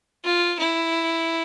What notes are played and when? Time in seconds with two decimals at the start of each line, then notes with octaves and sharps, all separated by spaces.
0.24 F4
0.59 E4